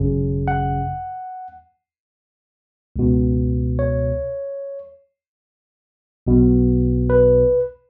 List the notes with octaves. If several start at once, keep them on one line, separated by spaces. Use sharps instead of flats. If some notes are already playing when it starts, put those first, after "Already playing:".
Already playing: G#1 F#2 C#3
F#5
C#2 B2
C#5
B1 B2
B4